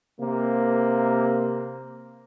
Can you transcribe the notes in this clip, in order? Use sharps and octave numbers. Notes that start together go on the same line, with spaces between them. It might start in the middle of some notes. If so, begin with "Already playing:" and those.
C3 A#3